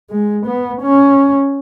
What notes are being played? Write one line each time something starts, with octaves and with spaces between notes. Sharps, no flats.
G#3
B3
C#4